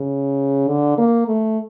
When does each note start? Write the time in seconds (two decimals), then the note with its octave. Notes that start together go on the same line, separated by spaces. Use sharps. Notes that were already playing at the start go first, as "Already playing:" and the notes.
Already playing: C#3
0.68 D3
0.98 A#3
1.28 A3